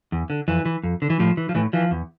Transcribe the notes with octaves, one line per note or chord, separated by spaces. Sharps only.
E2
D3
F2 E3
E3
F2
D3
E3
A2 F3
E3
F3
A2 E3
E3 F3
E2